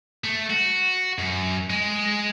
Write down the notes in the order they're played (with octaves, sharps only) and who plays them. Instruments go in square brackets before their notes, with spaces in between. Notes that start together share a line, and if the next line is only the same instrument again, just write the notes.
[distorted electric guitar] A3
F#4
F#2
G#3